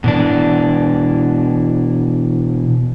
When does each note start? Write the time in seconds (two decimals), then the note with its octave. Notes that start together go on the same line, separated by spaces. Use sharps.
0.04 B2 E3 D4